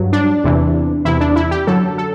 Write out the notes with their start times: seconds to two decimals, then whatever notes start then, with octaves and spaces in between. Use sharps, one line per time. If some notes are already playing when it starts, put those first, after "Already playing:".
Already playing: G2 F#3
0.13 D4
0.44 E2 C3 E3
1.05 E2 C3 E3 E4
1.21 D4
1.36 E4
1.51 G4
1.67 F#2 D3 F#3 A4
1.98 A4